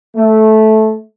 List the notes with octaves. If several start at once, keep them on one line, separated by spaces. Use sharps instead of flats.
A3